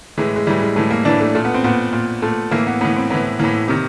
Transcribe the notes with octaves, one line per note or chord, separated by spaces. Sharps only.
A2 E3 G#3
G#3
A2 E3 G3
G#3
A2 E3 A3
A#3
A2 E3 D4
A3
A#2 A3
B3
C4
A#2 B3
A#2
A#2 A3
A2 E3 A#3
B3
A2 E3 B3
C4
A2 E3 B3
A2 E3 A#3
C3 D#3